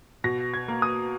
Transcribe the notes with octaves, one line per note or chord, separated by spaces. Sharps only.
B2 A#6
G#6
A#3
D#6